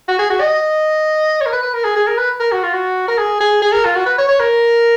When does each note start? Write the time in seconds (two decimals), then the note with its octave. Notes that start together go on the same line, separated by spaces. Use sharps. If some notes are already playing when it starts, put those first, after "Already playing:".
0.08 F#4
0.19 G#4
0.30 F#4
0.40 D#5
1.41 C#5
1.46 A#4
1.52 B4
1.63 B4
1.74 A#4
1.85 G#4
1.97 G#4
2.07 A#4
2.18 B4
2.40 A#4
2.52 F#4
2.63 F4
2.73 F#4
3.08 A#4
3.18 G#4
3.41 G#4
3.62 G#4
3.73 A#4
3.85 F4
3.95 F#4
4.06 B4
4.18 C#5
4.29 C#5
4.40 A#4